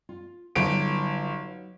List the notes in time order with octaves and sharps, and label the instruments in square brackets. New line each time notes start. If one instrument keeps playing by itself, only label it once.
[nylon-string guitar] F4
[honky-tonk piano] G1 D7 [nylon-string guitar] F#3 D#4 E5